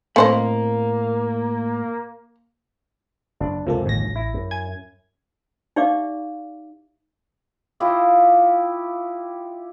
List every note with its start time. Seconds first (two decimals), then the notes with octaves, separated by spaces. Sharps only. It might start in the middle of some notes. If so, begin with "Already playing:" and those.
0.16 A2 A3 A#3 C4 C5 D#5 B5
3.40 F#1 D4
3.67 C#2 F#2 C3 F3 A#3 A4
3.86 A1 D#2 A#6
4.16 E4
4.34 F#2
4.51 G#5 G#6
5.76 D#4 G4 D5 E5 F5 D6
7.80 E4 F4 G4 D#5